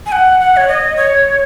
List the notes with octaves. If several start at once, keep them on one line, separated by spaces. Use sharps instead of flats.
G#5
F#5
F#5
C#5
D#5
C#5